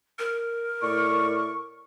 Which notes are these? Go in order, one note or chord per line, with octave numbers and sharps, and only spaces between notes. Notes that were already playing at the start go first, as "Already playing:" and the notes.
A#4
A2 D5 C#6